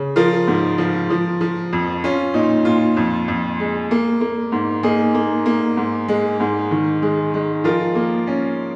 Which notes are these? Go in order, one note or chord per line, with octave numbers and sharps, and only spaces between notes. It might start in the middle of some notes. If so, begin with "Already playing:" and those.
Already playing: C#3
F3 F4 A#4
G#2
F3
F3
F3
F2
C#4 F4
A#2 D#4
A#2 F4
F2
F2
G#3
A#3
A#3
G#2
A#3 D#4 G#4
A#3
A#3
G#2
G#3
G#2
D#3
G#3
G#3
F3 F4 A#4
A#3
C#4